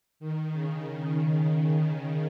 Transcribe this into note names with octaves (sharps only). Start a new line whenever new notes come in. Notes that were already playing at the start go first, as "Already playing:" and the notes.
D#3
C#3
D#3